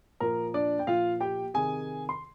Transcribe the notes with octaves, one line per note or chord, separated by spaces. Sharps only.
A#2 F3 A#4
D4 D5
G5
A#2 F3 F4 F5
G4 G5
C3 D#3 G#4 G#5
C6